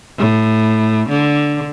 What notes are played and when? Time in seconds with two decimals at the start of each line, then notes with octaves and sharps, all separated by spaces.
0.18 A2
1.09 D3